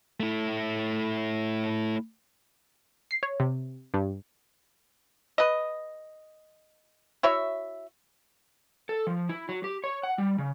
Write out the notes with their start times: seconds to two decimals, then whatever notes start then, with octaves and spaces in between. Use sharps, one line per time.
0.20 A3 E4
3.11 C7
3.23 C#5
3.40 C3
3.94 G2
5.38 B4 D#5
7.23 E4 F#4 C#5 E5
8.89 A4
9.07 F3
9.29 E4
9.49 F#3
9.64 G4
9.84 C#5
10.03 F#5
10.18 G3
10.38 C#3